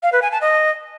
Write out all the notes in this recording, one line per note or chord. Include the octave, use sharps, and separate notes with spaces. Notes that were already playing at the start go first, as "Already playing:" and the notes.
F5
B4
G#5
A5
D#5